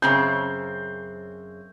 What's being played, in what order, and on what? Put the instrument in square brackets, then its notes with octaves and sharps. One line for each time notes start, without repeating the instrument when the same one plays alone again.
[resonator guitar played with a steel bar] F#2 C#3 C4 [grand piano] G6